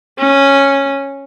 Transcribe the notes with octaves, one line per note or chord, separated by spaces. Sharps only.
C#4